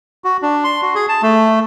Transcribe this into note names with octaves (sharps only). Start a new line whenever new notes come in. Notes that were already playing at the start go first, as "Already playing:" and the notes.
F#4
D4
C6
F#4
G#4
A5
A3